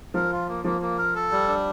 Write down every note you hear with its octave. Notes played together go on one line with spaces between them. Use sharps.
F3 A#4
F4
A#3
F3 A#3
A#3
A#4
A4
G3
D4